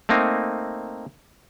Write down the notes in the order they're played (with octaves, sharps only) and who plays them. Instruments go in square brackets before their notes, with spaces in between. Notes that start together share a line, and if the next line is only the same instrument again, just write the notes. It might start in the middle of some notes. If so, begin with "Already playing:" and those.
[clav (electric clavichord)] A3 A#3 C4 D#4